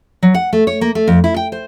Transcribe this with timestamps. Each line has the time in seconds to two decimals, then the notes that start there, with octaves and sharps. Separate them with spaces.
0.23 F#3
0.34 F#5
0.53 A3
0.67 C#5
0.81 A#3
0.95 A3
1.08 F2
1.24 E4
1.36 G5
1.52 C5